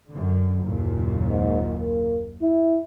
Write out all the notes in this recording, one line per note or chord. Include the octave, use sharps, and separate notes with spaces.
F#2 D3
F#1 D#2 A#2
G#2
A#3
E4